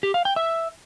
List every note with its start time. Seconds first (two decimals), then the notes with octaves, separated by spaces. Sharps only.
0.03 G4
0.14 F5
0.25 G5
0.36 E5